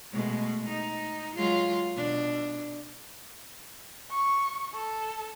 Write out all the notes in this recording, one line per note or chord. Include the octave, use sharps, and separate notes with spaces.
B2 G#3 A3
D#4
F#3 G#3 F4
B2 D4
C#6
A4